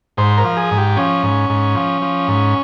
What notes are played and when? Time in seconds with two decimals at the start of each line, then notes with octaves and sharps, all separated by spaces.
0.17 G#2 C5
0.38 A#4
0.44 F3
0.57 G#4
0.71 G#2
0.77 G4
0.96 F3 C#4
1.23 G#2
1.49 G#2
1.75 F3
2.02 F3
2.28 G#2